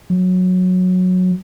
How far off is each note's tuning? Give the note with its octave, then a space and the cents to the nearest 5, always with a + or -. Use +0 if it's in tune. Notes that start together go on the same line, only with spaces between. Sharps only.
F#3 -15